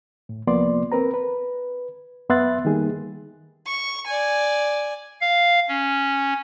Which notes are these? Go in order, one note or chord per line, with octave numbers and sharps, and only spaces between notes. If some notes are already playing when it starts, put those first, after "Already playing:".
A2
C2 F3 A#3 B3 D5 C6
C4 A#4 B4 A#5
B4
F#2 B3 E5 C6 F#6 A6
D#3 G3 A#3 D#4 G#4
C#6
D5 G#5
F5
C#4